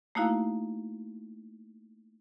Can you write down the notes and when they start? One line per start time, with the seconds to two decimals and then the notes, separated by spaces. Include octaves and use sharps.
0.15 A3 A#3 D#4 E4 F#4 F5